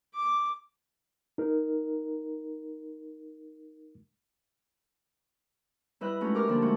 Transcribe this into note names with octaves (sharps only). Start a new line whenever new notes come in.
D6
D#4 A#4
G3 E4 B4 D#5 F#6
G#3 A3 C#4 D#4 F#4
G4 A#4 D6 F6
D3 F3 G3 A#3 D4 G4
G#3 A3 F#4